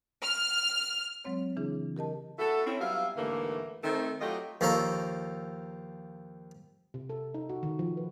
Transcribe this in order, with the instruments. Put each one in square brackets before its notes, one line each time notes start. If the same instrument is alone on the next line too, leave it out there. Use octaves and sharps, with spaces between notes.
[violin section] F6
[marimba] F#3 G#3 C4 C#5
C#3 E3 D4 E4 G#4
G4 A#4 D#5 A5
[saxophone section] B3 E4 F#4 A4
C4 C#4 E4
F#3 G3 B3 E5 F5
D#2 G#2 D3 E3 A3 A#3
D#3 A3 C4
F#3 A3 F4 G4 D#5
[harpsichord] D#2 F3 A4 C#5 F5 A#5
[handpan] C3
A4
D#4
F#4
D#3
F3
B4